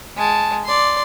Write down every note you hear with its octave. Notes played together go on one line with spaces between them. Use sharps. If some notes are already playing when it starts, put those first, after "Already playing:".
G#3 A5
D5 C6